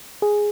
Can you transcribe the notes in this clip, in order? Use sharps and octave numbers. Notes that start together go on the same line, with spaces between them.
G#4